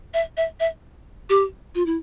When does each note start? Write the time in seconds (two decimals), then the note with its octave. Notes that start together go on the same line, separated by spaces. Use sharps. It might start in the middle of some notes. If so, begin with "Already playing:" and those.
0.14 E5
0.37 E5
0.60 E5
1.30 G4
1.75 F4
1.86 E4